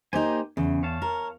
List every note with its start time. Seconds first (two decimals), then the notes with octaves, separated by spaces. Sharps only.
0.13 A#3 D#4 G4 C5 G#5
0.57 E2 C#3
0.83 C#5 F5 A5
1.02 A#4